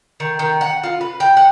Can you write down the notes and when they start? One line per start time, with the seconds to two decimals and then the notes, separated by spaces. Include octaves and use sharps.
0.20 D#3
0.39 D#3
0.61 F#5
0.83 F4
1.01 B4
1.20 G5
1.37 F#5